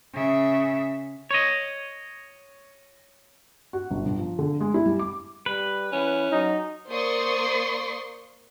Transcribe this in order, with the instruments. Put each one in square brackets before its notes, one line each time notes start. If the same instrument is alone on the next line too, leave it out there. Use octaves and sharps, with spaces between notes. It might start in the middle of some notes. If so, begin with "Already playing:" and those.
[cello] C#3 E5
[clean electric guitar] C#5 D#5
[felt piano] F#4
G1
G1
F3
D3
G#3
E4
G3
D6
[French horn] G3 [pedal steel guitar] B4
[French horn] E3 [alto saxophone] C#4
[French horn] F#3 [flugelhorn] D#4
[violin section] A#3 C5 D5 C6 C#6 D#6